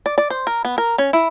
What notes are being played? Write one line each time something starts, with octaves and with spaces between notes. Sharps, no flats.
D5
D5
C5
A#4
B3
A#4
C#4
E4